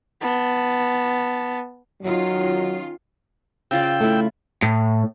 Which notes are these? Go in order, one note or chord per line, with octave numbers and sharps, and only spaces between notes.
B3 A5
D#3 F#3 C#4 F4
C#3 F4 D5 G5 E6
A3 E4
A2